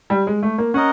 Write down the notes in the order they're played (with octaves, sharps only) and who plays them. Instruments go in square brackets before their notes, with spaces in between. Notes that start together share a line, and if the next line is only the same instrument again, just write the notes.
[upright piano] G3
G#3
A3
A#3
[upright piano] C#4 [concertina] A#4 D#5 F#5